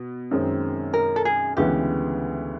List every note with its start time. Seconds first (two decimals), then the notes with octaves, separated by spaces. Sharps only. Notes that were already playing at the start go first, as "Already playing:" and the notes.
Already playing: B2
0.31 F#2 D#3 G#3 C4
0.94 A#4
1.16 A4
1.25 G#4
1.57 D2 C#3 E3 G#3 B3 G4